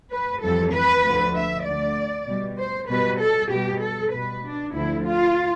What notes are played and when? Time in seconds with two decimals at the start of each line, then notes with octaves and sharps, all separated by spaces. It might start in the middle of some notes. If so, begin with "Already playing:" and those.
0.11 B4
0.41 F2 E3 G3 A4
0.73 B4
1.04 D2 D3 F3 A3
1.35 E5
1.65 D2 D3 A3 D5
2.27 B2 G3
2.58 C5
2.88 B2 G3 B4
3.20 A4
3.50 B2 G3 G4
3.81 A4
4.12 B2 G3 B4
4.43 D4
4.74 D2 D3 F3 E4
5.05 F4